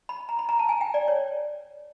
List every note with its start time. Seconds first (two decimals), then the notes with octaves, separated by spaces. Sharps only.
0.09 B5
0.29 A#5
0.39 B5
0.49 A#5
0.59 A5
0.69 G#5
0.81 G5
0.94 D5
1.08 C#5